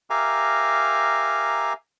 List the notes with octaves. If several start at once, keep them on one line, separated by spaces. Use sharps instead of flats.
G4 A#4 E5 F5 G#5 A#5